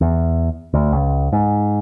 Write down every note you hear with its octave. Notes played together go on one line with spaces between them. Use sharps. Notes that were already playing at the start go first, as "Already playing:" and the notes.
E2
D2
C#2
G#2